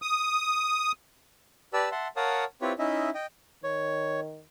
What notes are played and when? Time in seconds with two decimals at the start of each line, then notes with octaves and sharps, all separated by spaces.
0.02 D#6
1.73 G4 B4 D5 A5 E6
1.92 E5 F#5 A5 C6
2.16 A#4 C#5 F5 F#5 A5 D#6
2.62 C4 E4 F4 G4 B4 C#5
2.79 C#4 D#4 E4 D#5 E5
3.14 D#5 G5
3.64 D#3 C#5